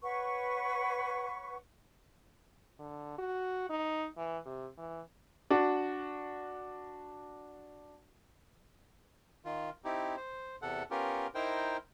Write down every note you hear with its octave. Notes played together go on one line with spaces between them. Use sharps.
B4 C#5 F#5 C#6
D3
F#4
D#4
E3
C3
E3
D4 F#4
D#3 F4
C4 D#4 E4 G4
C5
E2 C3 A4 F#5
B3 C#4 F4 G4 A#4
D#4 E4 A#4 C5 G5